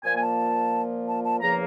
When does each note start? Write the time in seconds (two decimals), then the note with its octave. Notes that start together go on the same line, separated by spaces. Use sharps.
0.04 A#2 F3 A#3 G#5
0.17 G#5
0.21 A5
1.08 A5
1.24 A5
1.41 E2 C#3 F3 A#3 A#5